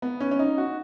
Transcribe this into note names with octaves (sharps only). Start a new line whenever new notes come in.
B3
C#4
C#4
D#4
F#4